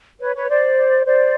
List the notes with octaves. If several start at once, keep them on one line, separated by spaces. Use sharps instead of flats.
B4 C#5
B4 C#5
C5 D5
C5 D5